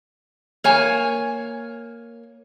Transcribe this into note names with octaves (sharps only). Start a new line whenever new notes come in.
A#3 C#5 G#5